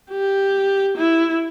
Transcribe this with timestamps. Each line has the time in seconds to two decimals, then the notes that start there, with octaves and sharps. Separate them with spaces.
0.11 G4
0.97 E4